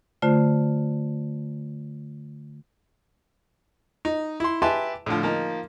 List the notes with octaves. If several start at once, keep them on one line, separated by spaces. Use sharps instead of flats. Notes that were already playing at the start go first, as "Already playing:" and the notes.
D3 A3 F4 C5
D#4
E4 C6
G4 B4 E5 G#5 A5 C6
A2 D3 F3
F3 A#3 D#4